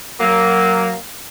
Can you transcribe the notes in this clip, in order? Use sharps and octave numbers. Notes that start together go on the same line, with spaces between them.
F#3 A#3